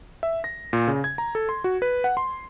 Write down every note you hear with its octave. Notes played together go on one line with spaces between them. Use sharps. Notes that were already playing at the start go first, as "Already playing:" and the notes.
E5
A#6
A#2
C#3
G#6
A#5
A4
C6
F#4
B4
F#5
C6